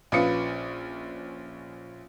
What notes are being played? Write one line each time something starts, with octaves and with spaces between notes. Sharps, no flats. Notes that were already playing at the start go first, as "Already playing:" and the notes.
A#1 C#4 F4 B4 D#6 C#7